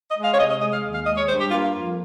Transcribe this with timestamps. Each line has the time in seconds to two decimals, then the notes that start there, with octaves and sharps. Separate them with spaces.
0.09 D#5
0.16 G#3
0.24 F5
0.34 C#5
0.39 C3 D#5
0.50 D#5
0.61 G#3 D#5
0.73 F5
0.84 D#2
0.94 F5
1.06 G#3 D#5
1.17 C#5
1.29 G2 C5
1.40 G4
1.51 A#3 F4
1.62 F4
1.74 F2 F4